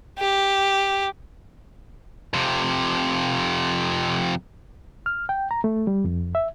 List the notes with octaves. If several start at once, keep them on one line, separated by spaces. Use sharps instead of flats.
G4
F2 C3
F6
G5
A#5
A3
G3
F2
E5